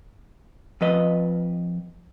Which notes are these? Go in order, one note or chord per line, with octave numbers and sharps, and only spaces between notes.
F2 F3 B4 D#5